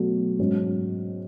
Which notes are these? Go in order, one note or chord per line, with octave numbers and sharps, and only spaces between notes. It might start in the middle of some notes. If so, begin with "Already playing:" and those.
Already playing: B2 F#3 A3
G#2 F#3 C#4